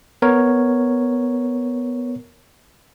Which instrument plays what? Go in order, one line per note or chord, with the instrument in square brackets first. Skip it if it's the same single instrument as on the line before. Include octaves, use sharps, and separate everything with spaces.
[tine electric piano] B3 A#4 C#5